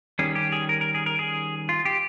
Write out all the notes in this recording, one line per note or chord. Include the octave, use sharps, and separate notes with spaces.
D#3 G3 C#4 G#4
G4
G#4
A#4
A#4
G#4
A#4
G#4
F4
G4